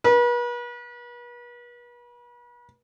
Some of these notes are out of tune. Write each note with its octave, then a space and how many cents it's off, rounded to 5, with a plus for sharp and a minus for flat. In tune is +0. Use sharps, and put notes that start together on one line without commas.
B4 -40